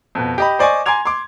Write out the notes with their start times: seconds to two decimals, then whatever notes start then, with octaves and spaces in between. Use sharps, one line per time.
0.15 F2 B2
0.38 G4 D#5 B5
0.59 C5 D5 D#5 G#5 C#6
0.86 G#5 A#5 C6 D6 G#6 F7
1.05 C6 D6